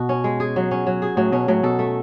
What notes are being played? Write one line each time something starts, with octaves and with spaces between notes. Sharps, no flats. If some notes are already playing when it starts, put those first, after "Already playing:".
Already playing: B2 F#4
C#4
G#3
G#4
F#3
C#4
F#3
G#4
A2 F#3
B2 C#4
A2 F#3
B2 A4
A3